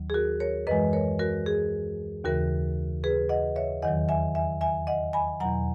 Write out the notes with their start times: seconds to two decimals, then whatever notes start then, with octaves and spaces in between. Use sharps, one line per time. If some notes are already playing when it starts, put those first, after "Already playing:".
Already playing: D#2 D#3 F#3
0.10 G#4
0.14 F#4 A#4
0.40 A#4 C#5
0.67 F#2 E3 G#3 B4 D#5
0.93 A#4 C#5
1.19 F#4 A#4
1.46 G#4
2.25 D#2 C#3 E3 F#4 A#4
3.04 G#4 B4
3.29 D#5 F#5
3.56 C#5 E5
3.82 E2 D#3 F#3 D#5 F#5
4.09 E5 G#5
4.35 E5 G#5
4.61 E5 G#5
4.87 D#5 F#5
5.13 G#5 B5
5.40 E2 B2 F#3 F#5 A#5